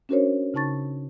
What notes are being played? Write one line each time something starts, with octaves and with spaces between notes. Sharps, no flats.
C#4 D4 F#4 A#4 C5 C#5
C#3 D#4 A5 C#6 A6